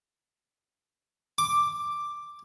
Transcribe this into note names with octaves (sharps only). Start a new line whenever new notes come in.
D6